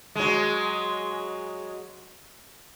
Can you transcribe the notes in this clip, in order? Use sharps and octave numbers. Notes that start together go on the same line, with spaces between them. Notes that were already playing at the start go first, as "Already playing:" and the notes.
F#3 G#3